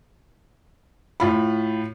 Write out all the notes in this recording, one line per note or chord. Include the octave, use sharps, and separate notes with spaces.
A2 F4 B5